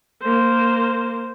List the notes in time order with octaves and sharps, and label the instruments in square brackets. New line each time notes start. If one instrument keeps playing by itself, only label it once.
[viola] A#3 C5